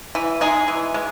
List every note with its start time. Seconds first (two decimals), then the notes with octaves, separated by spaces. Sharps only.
0.15 E3
0.41 G#3 D#4 G#4
0.68 E3
0.94 G#3